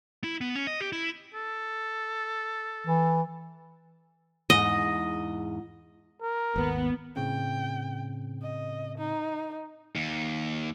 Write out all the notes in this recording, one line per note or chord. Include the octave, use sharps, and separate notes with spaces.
E4
B3
C#4
D#5
G4
E4
A4
E3
E2 G#2 D#5
A#4
G#1 D#2 B3
A2 C#3 C4 G5
D#5
D#4
D#2